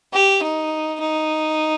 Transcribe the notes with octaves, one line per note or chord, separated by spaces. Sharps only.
G4
D#4
D#4